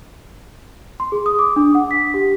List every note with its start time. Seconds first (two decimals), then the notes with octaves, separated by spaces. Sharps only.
1.00 C6
1.12 G#4
1.26 D#6
1.39 D6
1.56 D4
1.75 F#5
1.91 B6
2.14 G4